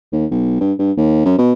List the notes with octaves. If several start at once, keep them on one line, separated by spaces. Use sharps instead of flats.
D#2
B1
G2
G2
D#2
F#2
B2